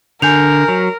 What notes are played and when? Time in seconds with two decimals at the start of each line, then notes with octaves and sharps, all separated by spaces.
0.22 D3 A#4 G#5 G6 F7
0.68 F#3